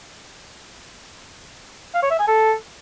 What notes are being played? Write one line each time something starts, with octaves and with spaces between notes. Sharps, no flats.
F5
C#5
E5
G#5
A4